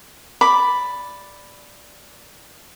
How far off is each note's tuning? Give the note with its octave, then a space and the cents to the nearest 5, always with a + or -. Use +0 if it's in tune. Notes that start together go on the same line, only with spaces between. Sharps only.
D5 +0 B5 +0 D6 +0